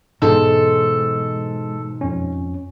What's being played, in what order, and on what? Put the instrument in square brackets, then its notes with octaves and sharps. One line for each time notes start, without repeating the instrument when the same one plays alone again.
[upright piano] G#2 [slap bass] B2 E3 F#3 [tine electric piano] G#3 [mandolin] A4 C5
[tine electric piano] F2 C#4